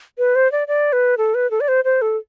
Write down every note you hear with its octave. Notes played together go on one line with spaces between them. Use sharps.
B4
C5
D5
D5
B4
A4
B4
A4
D5
C5
C5
A4